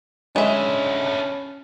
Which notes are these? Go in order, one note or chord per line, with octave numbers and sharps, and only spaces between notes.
G#3 C#4 D4 E4 E5